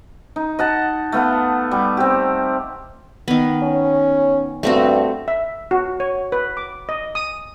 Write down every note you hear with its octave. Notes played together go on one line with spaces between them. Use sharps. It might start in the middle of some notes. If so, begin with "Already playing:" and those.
D#4
D#5 F#5 A5
A3 B3 F5 F#5
G3
C4 G4
D#3 B3
C#4
G2 A3 C4 F#4
E5
F#4
C#5
B4
D6
D#5
D#6